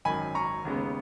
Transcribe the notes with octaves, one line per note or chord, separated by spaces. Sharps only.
G#1 F#2 D#3 G#5 B5
A#5 C#6
D#2 C#3 G#3 B3